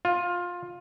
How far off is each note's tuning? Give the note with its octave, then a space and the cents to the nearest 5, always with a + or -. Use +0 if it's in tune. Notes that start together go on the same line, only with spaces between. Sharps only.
F4 +15